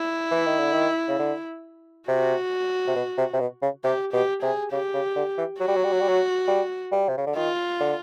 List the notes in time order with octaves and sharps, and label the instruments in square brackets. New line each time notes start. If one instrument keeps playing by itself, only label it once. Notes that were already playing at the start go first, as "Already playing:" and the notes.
Already playing: [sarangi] E4
[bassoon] E3
D#3
D3
D#3
C#3
D3
[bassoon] C3 [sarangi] F#4
[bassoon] C3
B2
C3
C3
B2
C#3
[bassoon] C3 [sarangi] G4
[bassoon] B2 [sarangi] G4
[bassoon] C3 [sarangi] G#4
[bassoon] C#3 [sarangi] G4
[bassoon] C#3
D3
E3
[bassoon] F#3 [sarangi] F#4
[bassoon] G3
F#3
G3
F#3
G3
F#3
G3
G3
C3
C#3
D3
[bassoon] D#3 [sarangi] F4
[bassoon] D3